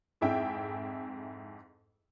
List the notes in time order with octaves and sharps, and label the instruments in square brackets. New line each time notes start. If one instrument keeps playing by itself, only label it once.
[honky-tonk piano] F2 G#2 E4 G#4 E5 G5